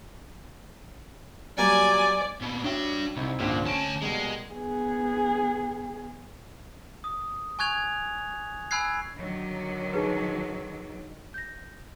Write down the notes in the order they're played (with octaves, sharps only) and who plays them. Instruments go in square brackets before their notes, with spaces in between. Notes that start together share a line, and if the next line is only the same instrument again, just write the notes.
[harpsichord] F#3 G3 A#3 [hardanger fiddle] D5 [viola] G#5
[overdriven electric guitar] A#2 B3
[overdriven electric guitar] D4 G5 [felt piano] F#4 C#5 E5
[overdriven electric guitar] C2 [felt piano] C4 D#4 E4
[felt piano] G#1 C#2 D4 [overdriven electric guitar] A#2
[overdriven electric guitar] D2 A5 [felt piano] C#4 C#6 D7
[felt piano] B2 G3 A#3 [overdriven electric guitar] G#3
[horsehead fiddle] B3 G#4
[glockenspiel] D#6
G#5 C#6 F#6 G#6 F7
G#5 B5 E6 F#6 G#6 C7
[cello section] D3 D#3 F#3
[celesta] D#4 G#4 B4
G6 A#6